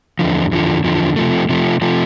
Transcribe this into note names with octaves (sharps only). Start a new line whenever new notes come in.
E2 D3 F3
E2 D3 F3
E2 D3 F3
C3 F3 A3
C3 F3 A3
C3 F3 A3